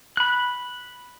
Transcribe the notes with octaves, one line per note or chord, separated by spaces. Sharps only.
B5 F#6